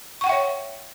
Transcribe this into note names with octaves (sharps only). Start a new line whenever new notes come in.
C#5 E5 F#5 G5 C#6